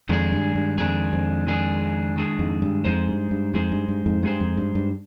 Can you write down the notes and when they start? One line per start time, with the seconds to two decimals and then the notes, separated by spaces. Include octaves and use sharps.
0.09 F2 D#3 G#3 D4 G#4
0.33 G2
0.55 G2
0.78 F2 D#3 G#3 D4 G#4
1.13 F2
1.47 D#3 G#3 D4 G#4
2.16 D#3 G#3 D4 G#4
2.39 F2 G#2
2.62 G2
2.85 F2 G#3 D#4 G#4 C5
3.08 G2
3.31 G2
3.54 F2 G#3 D#4 G#4 C5
3.72 G2
3.88 G2
4.06 F2 G#2
4.23 G2 G#3 D#4 G#4 C5
4.40 F2
4.57 G2
4.75 G2